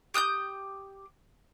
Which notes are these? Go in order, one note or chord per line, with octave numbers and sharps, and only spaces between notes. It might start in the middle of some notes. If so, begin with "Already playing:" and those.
G4 D#6 F#6 G6